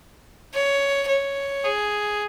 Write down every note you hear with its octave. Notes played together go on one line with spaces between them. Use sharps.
C#5
C#5
G#4